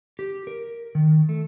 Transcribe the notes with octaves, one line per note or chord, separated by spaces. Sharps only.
G4
A#4
D#3
A3